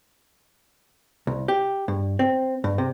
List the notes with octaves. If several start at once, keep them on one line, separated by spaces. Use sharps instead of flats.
C2
G4
G2
C4
G2
C3